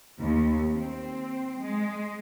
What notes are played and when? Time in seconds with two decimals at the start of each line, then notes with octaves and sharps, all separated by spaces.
0.19 D#2
0.72 C4
1.60 G#3